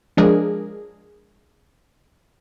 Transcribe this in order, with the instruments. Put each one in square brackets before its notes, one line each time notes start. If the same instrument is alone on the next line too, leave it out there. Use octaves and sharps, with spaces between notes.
[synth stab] F3 G#3 D4 G#4 A#4